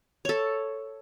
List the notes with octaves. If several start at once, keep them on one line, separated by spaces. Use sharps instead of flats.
A4 C#5